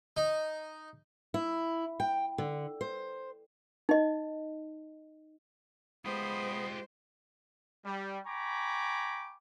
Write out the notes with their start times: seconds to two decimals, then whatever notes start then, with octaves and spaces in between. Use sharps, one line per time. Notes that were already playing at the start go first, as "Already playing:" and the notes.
0.17 D#4
1.34 E4
2.00 G5
2.38 D3
2.81 C5
3.89 D#4 D#5
6.05 G#3 B3 F4 G4 C5 B5 D#6
7.85 G3
8.27 G5 G#5 A#5 B5 C#6 D6